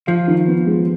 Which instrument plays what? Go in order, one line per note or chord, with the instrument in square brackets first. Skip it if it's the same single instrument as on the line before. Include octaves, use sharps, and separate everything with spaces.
[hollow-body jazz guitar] F3 [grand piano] F4
[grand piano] D#3
B3
G#3